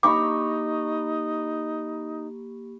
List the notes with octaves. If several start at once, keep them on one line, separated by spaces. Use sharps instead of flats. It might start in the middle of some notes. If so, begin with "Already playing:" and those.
A#3 D#4 G4 A#5 B5 C#6 D6